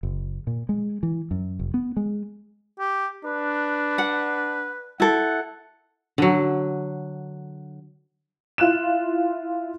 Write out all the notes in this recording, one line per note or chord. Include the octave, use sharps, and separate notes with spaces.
F#1
A#2
G#3
E3
F#2
F1
B3
G#3
G4
D4 B4
F#5
E4 A4 F#5
D3 F#3
E4 F4 F#6 E7